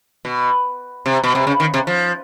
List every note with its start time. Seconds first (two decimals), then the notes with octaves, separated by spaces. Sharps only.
0.25 B2
1.06 C3
1.24 B2
1.35 C3
1.47 C#3
1.60 D#3
1.74 C3
1.87 F3